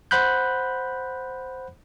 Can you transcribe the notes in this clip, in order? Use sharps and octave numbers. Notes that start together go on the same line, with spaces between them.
C5 F#5 B5 F#6 G6